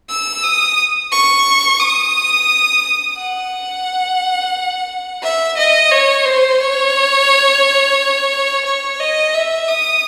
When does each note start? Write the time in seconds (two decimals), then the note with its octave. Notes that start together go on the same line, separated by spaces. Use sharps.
0.09 E6
0.43 D#6
1.12 C#6
1.80 D#6
3.17 F#5
5.23 E5
5.57 D#5
5.91 C#5
6.25 C5
6.60 C#5
8.65 C#5
9.00 D#5
9.34 E5
9.68 D#6